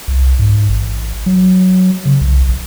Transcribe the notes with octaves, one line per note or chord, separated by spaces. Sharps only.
C2
G#2
A1
F#3
C#3
C2
A#1